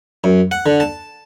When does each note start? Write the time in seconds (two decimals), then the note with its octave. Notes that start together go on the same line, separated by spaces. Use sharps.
0.24 F#2
0.51 F#5
0.66 D3
0.80 A5